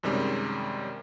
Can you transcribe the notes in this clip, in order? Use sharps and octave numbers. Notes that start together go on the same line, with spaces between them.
F#2 C3 D#3 G3 G#3 C#4